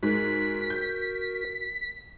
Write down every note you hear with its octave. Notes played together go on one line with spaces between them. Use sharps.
G#2 F#4 A#4 B6
G6